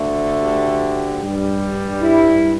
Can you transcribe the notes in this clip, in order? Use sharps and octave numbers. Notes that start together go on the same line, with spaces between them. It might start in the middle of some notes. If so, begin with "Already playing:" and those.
Already playing: D2 D3 A3
G4
G2 G3
E4